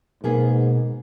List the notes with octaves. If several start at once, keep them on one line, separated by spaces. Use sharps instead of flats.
G#2 B2 A#3 B3 G#4